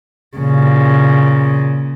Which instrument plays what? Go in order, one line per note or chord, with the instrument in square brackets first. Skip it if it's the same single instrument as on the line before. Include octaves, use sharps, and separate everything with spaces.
[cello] A#2 C#3